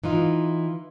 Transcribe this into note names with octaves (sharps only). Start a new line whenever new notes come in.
E3 D#4 F4